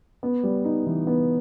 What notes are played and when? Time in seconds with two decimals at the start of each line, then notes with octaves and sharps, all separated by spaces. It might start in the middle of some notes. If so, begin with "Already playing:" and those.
0.23 B3
0.43 G3
0.65 D#4
0.86 E3
1.07 B3